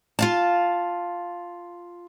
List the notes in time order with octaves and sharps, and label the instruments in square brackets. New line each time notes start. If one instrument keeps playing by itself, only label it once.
[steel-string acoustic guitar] F4 F5 A5